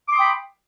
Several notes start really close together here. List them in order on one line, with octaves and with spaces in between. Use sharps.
D6 C6 D#6 G5 B5